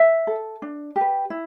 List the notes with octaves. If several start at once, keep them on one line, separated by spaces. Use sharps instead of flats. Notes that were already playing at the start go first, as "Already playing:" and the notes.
Already playing: E5
A4
D4
G4
B4
E4